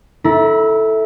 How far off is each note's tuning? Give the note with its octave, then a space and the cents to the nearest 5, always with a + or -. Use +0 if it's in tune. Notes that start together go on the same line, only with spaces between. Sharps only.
E4 -15 A4 +0 A#5 +35